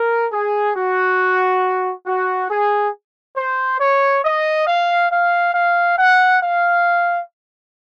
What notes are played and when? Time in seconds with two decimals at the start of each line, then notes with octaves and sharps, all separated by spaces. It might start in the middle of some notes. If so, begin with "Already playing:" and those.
Already playing: A#4
0.31 G#4
0.74 F#4
2.05 F#4
2.49 G#4
3.36 C5
3.79 C#5
4.24 D#5
4.66 F5
5.11 F5
5.53 F5
5.97 F#5
6.41 F5